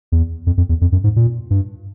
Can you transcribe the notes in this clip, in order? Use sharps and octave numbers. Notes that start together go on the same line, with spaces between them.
E2
F2
F2
E2
F2
F#2
G#2
A#2
G2